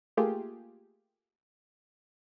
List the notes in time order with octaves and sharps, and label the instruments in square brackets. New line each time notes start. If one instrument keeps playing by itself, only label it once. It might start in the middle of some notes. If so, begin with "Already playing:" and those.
[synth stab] A3 A#3 F4 G4 G#4